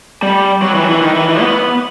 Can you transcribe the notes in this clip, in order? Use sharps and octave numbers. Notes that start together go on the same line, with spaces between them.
G3
F#3
E3
F#3
E3
D#3
E3
E3
B3